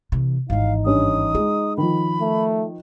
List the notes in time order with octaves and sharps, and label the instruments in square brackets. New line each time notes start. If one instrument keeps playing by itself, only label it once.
[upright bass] C3 E3
[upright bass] G#1 E3 [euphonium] D#4 [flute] F5
[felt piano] G2 C#4 [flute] D#6
[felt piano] G#3 [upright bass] F4
[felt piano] D#3 F3 [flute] B5
[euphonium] A3